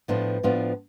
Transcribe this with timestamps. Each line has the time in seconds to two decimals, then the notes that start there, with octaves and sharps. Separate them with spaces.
0.08 A2 F3 B3 D4 F4
0.43 A2 F3 B3 D4 F4